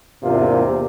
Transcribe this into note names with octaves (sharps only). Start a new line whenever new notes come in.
E2 G#2 C3 A#3 D4 F4